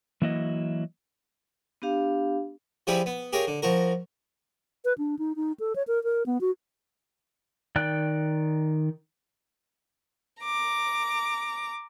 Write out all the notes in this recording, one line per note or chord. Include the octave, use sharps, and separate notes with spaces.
E3 F#3 A#3 E4 F#4 D#5
B3 D4 G4 F5
F3 G3 E4 G4 G#4 B4
B3
G4 G#4 A#4 C#5 F5
D3
F3 F#4 A#4
B4
D4
D#4
D#4
A4
C#5
A#4
A#4
B3
F#4
D#3 D5 G5 F#6
A#5 D6